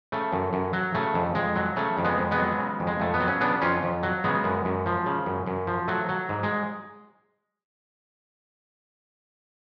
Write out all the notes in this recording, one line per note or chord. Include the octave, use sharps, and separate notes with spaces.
C#3 A3
F#2
F#2
F#3
C#3 A3
F2
F2 G#3
F#3
C#3 A3
F2
G#3 B3
F2
G#3 B3
F#3
C#3
F2
G#3
F2 A3
B3
F#3
C#4
C#3 B3 D4
F2 C#4 F4
F2
F#3
C#3 G#3 B3
F#2
F#2
F3
C#3
F#2
F#2
F3
F#3 A3
F#3
G#2
G#3